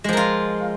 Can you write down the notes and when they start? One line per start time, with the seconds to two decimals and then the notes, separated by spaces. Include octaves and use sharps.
0.04 G#3
0.09 F3
0.13 A#4
0.17 F4